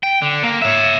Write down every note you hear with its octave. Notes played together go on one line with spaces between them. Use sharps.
G5
D3
A#3
C#5 E5